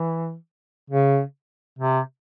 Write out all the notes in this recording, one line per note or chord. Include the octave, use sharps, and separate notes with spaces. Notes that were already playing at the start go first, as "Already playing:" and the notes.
Already playing: E3
C#3
C3